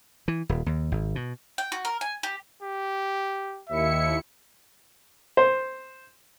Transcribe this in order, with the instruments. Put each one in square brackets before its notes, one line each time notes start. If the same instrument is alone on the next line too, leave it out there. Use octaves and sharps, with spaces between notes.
[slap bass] E3
D#1
D#2
G#1
B2
[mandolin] G5
F#4
A#4
G#5
G4
[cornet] G4
[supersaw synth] D#2 E4 C#7 [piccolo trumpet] E5
[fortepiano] C5